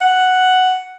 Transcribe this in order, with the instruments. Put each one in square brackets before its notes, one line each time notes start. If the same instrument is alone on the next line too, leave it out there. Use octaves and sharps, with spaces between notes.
[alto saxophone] F#5